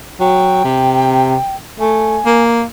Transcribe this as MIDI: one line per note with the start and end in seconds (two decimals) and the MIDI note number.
0.20 0.63 54
0.20 1.55 79
0.65 1.36 48
1.80 2.18 57
1.80 2.43 80
2.26 2.63 58